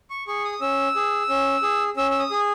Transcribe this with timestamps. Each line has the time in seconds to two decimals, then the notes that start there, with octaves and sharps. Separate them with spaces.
0.10 C#6
0.27 G#4 C#6
0.45 D#6
0.61 C#4 E6
0.96 G#4
1.29 C#4
1.62 G#4
1.97 C#4 E6
2.11 E6
2.19 D#6
2.31 G#4